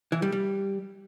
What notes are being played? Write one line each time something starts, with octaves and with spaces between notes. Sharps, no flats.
E3
G3
G3